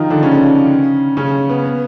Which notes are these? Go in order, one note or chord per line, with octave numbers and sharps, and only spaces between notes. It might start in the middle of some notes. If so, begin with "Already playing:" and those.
Already playing: D#3 F3 D#4 F4
D3 D4
C#3 C#4
C#3 C#4
B3
B3